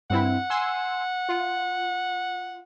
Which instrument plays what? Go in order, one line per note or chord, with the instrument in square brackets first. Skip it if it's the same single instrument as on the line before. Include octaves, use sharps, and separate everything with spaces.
[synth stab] G2 C4 E4 [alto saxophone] F#5
[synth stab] G#5 C6 E6
F4